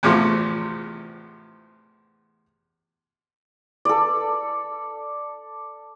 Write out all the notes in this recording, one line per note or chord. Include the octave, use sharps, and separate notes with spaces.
E2 A2 C3 F3
A4 D5